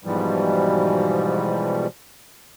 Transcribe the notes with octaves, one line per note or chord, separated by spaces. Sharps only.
G#2 B2 E3 F3 G3